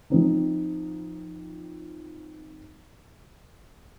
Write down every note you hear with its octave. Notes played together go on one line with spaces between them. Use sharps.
F3 C4 D#4